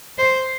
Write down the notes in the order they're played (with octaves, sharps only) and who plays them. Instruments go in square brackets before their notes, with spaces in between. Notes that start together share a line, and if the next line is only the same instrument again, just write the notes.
[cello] C5